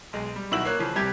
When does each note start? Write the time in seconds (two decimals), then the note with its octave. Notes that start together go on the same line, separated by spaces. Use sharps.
0.13 B1 G#3
0.36 G3
0.51 B1 D#3 E4 F#4 E6 F#7
0.65 A#3 C#5 F#6
0.79 C#3 E3 F3 C#4
0.96 C2 C3 G3 G4 G#6